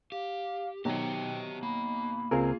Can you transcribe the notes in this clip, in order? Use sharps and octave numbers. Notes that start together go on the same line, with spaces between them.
G4 F5
B2 D#3 F#3 G4 C5 E5 G5
A#3 B5
C#2 C4 F4 G#4 A#4